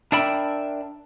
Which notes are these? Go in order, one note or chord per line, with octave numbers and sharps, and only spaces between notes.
D4 A#4 D5 E5 G5 B5